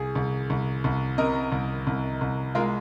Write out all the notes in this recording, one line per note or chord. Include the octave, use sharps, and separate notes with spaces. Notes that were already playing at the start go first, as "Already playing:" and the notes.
Already playing: C2 G#4
C2
C2
C2
C3 A#4 D#5
C2
C2
C2
G#3 F4 A#4